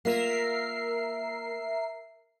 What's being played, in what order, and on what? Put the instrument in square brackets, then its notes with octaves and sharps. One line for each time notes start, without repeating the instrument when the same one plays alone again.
[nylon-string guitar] A#3 F4 [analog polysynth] A#4 E5 C7